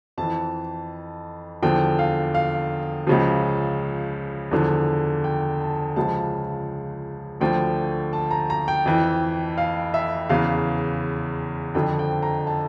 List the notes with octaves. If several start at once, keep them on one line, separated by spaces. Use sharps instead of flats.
F2 E3 A5
E2 D3 F3 G5
F5
F5
C#2 C#3 F3
E2 D3 F3
G5
A5
C#2 C#3 F3 A5
D2 D3 F3 G5
A5
A#5
A#5
G5
F2 E3
F5
E5
E2 C#3 E3 F5
F2 D3 F3 G5
G5
A#5
A5